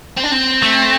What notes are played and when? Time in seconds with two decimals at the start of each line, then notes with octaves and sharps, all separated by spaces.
0.17 C4
0.24 D4
0.31 C4
0.63 A3